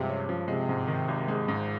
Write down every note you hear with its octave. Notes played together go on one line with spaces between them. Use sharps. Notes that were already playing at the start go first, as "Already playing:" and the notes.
Already playing: G2 C3 F3 G#3
C#4
F3
C3 G#3
G#2
D#3
G#1
G#3
G#2